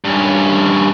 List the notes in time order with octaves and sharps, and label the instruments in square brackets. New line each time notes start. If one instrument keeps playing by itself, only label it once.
[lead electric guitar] G2 C#4